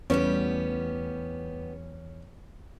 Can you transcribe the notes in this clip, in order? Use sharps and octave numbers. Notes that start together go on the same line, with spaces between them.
E2 G3 A3 B3 C#4 D4 G4